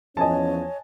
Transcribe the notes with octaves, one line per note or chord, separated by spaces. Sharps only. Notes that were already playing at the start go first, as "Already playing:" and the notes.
E2 F3 C#4 C#5 D#5 G#5 A5